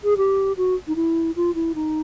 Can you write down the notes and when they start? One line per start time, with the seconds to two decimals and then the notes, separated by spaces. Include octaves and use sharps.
0.04 G#4
0.17 G4
0.57 F#4
0.88 D#4
0.96 E4
1.36 F4
1.55 E4
1.75 D#4